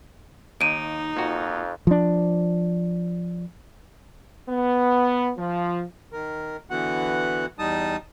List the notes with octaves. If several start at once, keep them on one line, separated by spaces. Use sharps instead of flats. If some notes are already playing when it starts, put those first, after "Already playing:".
D#2 D#4 D7 D#7
F2 A#2 F#4
F3 D4
B3
F3
D#3 A#4
D3 E3 B3 F#4 F#5
E2 G3 D#4 A5 D#6